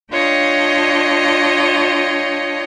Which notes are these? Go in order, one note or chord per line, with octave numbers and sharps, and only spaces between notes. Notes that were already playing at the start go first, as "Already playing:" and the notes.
D4 F4 C#5 D#5 G5